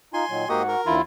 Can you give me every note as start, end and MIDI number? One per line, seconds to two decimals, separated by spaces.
0.14 0.25 63
0.14 0.25 65
0.14 0.48 80
0.14 0.48 84
0.30 0.45 46
0.30 0.45 51
0.30 0.45 54
0.49 0.75 44
0.49 0.62 58
0.49 0.81 66
0.49 0.62 67
0.49 0.62 75
0.49 0.81 78
0.49 0.81 85
0.68 0.95 70
0.86 1.00 39
0.86 1.00 50
0.86 1.00 52
0.86 1.02 64
0.86 1.02 65